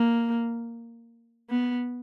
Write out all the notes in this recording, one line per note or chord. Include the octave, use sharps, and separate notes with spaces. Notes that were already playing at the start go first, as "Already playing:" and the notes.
Already playing: A#3
B3